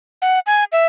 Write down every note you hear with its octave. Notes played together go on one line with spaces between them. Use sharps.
F#5
G#5
E5